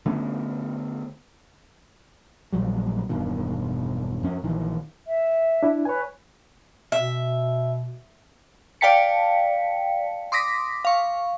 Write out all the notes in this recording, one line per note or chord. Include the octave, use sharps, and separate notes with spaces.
D3 A3 B3 C#4
A#1 F#3 G3
E1 G2 B2 D#3
F2 C#4
A#1 D#3 E3
E5
D4 E4
B4 C#5 G#5
B2 E5
D5 F5 G5 A5 B6 C#7
C6 D6 D#6 A#6 B6
F5 C#6